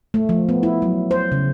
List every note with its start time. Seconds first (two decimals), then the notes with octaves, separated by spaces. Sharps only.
0.14 A3
0.29 F3
0.49 B3
0.63 E4
0.82 F#3
1.11 C5
1.32 C#3